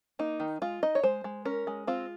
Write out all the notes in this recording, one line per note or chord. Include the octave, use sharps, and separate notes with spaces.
A#3 D#4
D#3
G#3 F4
D#4 D#5
C#5
G#3 C5
G#3
C#4 A#4
G#3
C4 F4